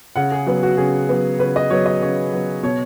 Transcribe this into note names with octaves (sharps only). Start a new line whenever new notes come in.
C#3 F#5
G#4
F#3 B3
F#4
C#3 G#4
F#3 B3
C#3 B4
D#5
F#3 B3 C#5
D#5
C#3 C#5
F#3 B3
B2 C#5